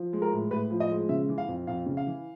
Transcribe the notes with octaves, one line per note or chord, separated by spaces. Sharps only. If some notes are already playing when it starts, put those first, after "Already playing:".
Already playing: F3
G#3
A#4
A2
A2 B4
F3
D#5
G#3
C#3 E5
E3
F5
F2
F2 F5
C#3
F5
E3